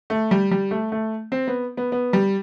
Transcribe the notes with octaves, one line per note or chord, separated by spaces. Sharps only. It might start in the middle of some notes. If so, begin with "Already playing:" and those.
A3
G3
G3
A3
A3
C4
B3
B3
B3
G3